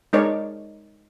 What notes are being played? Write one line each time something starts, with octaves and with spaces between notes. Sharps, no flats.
G#3 D#4 A#4 C#5 D5